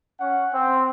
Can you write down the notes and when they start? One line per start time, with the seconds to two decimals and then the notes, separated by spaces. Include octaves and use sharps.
0.20 C#4 F#5
0.54 C4